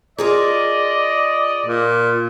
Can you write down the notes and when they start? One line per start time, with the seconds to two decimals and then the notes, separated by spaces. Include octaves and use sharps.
0.18 F4 G#4 A#4 D5 D#5
1.66 A#2